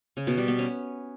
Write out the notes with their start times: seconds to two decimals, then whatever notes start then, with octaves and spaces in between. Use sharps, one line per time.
0.17 C#3
0.27 B2
0.38 G3
0.48 B3
0.58 C#4